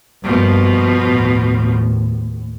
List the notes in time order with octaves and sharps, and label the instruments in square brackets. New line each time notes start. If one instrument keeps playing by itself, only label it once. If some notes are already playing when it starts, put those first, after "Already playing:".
[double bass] G2 A#3 [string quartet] B2 F3
[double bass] D#2 A2